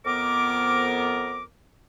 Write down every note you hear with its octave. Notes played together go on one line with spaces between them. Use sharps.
F2 B3 A#4 D6